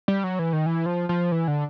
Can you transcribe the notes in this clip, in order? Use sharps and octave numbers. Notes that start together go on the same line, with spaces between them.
G3
F#3
E3
D#3
E3
F3
F3
E3
D3